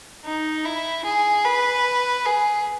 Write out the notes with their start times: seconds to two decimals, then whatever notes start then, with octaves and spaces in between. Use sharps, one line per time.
0.25 D#4
0.65 E4
1.05 G#4
1.45 B4
2.26 G#4